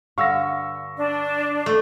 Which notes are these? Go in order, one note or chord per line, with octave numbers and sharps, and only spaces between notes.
G2 D3 F5 C#6 E6 A#6
D4
A3